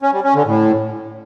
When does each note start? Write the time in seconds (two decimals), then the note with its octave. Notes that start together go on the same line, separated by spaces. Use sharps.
0.02 C#4
0.13 G3
0.24 C#4
0.35 D3
0.46 A2